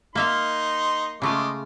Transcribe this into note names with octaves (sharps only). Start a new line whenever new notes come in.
A#3 D#4 E5 F5 C6
C#3 G#3 A3 F4 D6